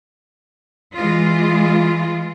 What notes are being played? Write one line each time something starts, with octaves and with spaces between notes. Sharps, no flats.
E3 G#3 F4